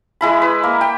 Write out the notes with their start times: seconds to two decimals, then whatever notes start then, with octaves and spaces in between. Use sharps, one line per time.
0.21 G#3 E4 B5
0.42 B4
0.63 A#3
0.81 G5